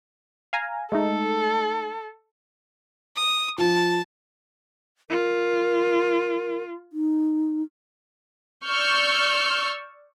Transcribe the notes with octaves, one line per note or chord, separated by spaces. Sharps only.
F5 G#5 A#5
G#3 A3 D#4 A4
D#6
F3 A5
F4 A#4
D#4
D5 C#6 E6 F6 G6